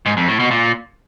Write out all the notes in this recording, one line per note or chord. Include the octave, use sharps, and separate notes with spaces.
G#2
F2
A2
B2
A#2